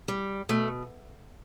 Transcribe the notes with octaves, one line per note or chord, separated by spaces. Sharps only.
G3
B2 A3